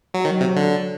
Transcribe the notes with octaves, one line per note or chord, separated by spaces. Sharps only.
F#3
D#3 F#3
C3
D3